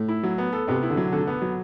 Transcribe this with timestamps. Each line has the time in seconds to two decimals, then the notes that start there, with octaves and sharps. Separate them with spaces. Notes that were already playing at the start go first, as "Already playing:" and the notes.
Already playing: A2
0.09 E4
0.23 F#3
0.38 B3
0.53 A4
0.67 C3 B3
0.83 E4
0.90 D3
0.97 F#3
1.12 D3 A4
1.27 B3
1.42 F#3